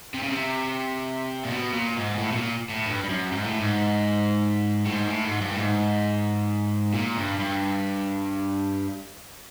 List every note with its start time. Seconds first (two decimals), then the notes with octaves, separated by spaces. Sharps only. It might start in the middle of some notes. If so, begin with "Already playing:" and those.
0.14 C3
0.23 C#3
0.31 C3
1.43 A#2
1.50 B2
1.74 A#2
1.97 G#2
2.15 A#2
2.18 A2
2.32 B2
2.36 A#2
2.70 A2
2.86 G2
3.04 G2
3.09 F#2
3.32 G#2
3.45 A2
3.58 G#2
4.85 A2
4.91 G#2
5.07 A2
5.25 G#2
5.41 G2
5.52 A2
5.59 G#2
6.94 A#2
7.17 G2
7.40 G2